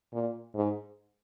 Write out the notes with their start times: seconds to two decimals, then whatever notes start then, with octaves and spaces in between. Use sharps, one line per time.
0.13 A#2
0.55 G#2